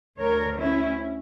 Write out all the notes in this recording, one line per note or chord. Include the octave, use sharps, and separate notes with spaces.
D2 D3 A#4 C#5
C#4 E4